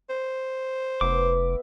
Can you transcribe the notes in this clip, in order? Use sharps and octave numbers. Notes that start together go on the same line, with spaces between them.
C5
F1 B3 E5 B5 D6